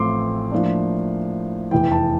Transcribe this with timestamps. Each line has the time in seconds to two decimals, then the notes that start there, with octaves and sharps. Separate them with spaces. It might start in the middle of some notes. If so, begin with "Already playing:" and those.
Already playing: A1 A2 F3 A3 C4 C6 D6
0.51 A2 F3 A#3 D4
1.71 F1 E2 E3 G5
1.92 A5